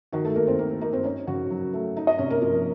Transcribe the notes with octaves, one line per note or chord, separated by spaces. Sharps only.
D#3 F#4
A3 A4
D#3 A#3 A#4
C4 C5
A#3 A#4
A#3 D#4 A#4
C4 C5
C#4 D#4 C#5
C#3 F#4 F#5
F#3
A3
D#4
D#4 D#5
C3 C#4 C#5
A#3 A#4
F3 A#3 A#4